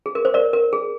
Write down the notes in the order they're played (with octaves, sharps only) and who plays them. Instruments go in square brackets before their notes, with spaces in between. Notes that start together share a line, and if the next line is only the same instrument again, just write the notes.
[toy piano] G#4
A#4
C5
A#4 D5
A#4
G#4